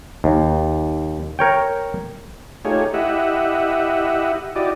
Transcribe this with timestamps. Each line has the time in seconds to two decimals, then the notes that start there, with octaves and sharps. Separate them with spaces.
0.24 D#2
1.39 A#4 C#5 G5
2.65 A3 D#4 F4 G4 G#4 C#5
2.94 E4 G4 D#5 E5 F#5
4.56 E4 F#4 G4 D5 D#5